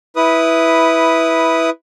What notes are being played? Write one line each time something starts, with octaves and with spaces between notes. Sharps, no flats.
E4 B4 D#6